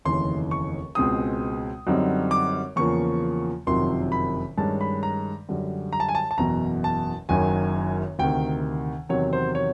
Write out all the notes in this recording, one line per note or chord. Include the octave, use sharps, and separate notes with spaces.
F1 D#2 C#3 E3 C6
C#6
C#2 B2 G#3 C4 D#6
F#2 D3 G3 C4 D#4
D6
E2 C#3 F3 A#3 C#6
F#1 F2 C3 D#3 F#3 C6
B5
G2 D#3 G#3 C#4 A5
B5
A#5
F#2 D3 G3
A#5
A5
G#5
A5
A5
F#1 E2 B2 A#5
A5
F#1 F#2 D#3 F#3 G#5
D2 C3 D#3 G5
E2 C3 D#3 F#3 C#5
C5
C#5